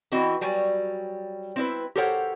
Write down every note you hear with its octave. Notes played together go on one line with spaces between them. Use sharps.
E3 C4 E4 F#4 D#5
F#3 G3 G#5
C4 E4 B4
G4 A4 A#4 C5 C#5 F#5